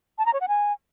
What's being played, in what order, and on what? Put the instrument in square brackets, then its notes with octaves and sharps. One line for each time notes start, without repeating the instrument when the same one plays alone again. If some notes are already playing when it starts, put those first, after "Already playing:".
[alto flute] A5
A#5
C#5
F#5
G#5